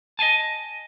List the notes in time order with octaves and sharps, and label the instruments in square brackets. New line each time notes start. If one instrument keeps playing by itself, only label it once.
[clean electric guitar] D#5 F5 G#5 A5